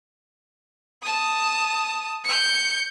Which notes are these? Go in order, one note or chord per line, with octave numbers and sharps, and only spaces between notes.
A5 D#6
G6 C#7